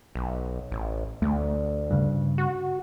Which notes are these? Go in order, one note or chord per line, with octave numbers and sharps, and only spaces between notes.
B1
A1
D2 A3
G2 C#3
F#4